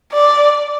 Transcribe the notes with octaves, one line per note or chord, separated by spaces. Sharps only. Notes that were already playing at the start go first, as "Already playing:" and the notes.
D5